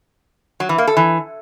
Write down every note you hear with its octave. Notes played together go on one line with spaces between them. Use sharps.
F#3
E3
A#3
A4
E3